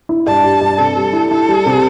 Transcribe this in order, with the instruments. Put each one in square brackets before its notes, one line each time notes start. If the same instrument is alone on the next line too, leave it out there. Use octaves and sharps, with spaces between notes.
[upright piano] E4
[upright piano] G2 [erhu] A5
[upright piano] G4
G2
[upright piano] C3 [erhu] A4
[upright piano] G3
E4
[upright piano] E4 [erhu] A4
[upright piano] G3
C3